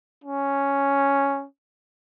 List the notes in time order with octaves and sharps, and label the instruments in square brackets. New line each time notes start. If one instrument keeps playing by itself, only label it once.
[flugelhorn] C#4